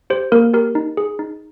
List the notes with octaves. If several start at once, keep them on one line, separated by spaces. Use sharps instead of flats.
G4 C5
A#3 A#4
G4 A#4
D#4
G#4
D#4